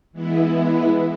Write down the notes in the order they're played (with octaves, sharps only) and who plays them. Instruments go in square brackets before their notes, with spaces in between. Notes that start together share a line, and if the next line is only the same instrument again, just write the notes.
[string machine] E3 G#3 B3 E4